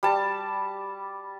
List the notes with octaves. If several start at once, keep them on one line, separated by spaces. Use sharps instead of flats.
G3 A5